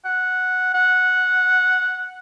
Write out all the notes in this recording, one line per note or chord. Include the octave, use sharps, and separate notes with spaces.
F#5
F#5